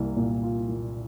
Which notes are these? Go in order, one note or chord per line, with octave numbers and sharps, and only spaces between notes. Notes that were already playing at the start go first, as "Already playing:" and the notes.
Already playing: C2 A#3
A#2
F4
A#3